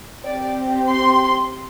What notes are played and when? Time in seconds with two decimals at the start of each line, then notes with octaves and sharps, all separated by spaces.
0.25 C4 G4 D5
0.89 C6